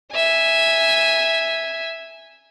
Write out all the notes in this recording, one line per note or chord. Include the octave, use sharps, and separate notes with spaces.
E5 G#5